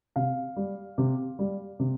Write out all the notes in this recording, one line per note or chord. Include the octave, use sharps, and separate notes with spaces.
C3 F5
G3
C3
G3
C3